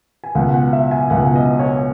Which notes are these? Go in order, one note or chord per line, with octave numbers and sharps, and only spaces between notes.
G#5
C#2 B2 F#5
F#5
E5
G#5
C#2 B2 F#5
D#5
C#5